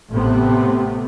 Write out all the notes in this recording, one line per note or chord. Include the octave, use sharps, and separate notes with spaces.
A1 C3 A3 B3 C4